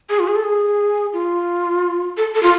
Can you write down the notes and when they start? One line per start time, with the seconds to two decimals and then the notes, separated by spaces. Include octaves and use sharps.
0.09 G#4
0.19 F4
0.27 G#4
0.36 A4
0.44 G#4
1.13 F4
2.17 A4
2.34 A4
2.43 F4